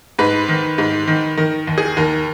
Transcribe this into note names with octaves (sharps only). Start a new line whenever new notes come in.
G#2 B4
D#3
G#2
D#3
D#3 A#4
D#2
G#4
D#2 A#4